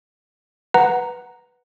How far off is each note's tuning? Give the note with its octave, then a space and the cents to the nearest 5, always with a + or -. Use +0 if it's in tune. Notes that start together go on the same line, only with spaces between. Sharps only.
B4 +0 F#5 +0 A#5 +0